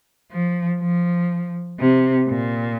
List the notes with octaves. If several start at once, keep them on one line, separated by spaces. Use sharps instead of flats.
F3
F3
C3
A#2